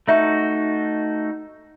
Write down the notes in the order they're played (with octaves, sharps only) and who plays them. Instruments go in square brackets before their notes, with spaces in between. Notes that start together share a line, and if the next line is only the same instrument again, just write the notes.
[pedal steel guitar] A3 D#4 F#4 [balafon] E5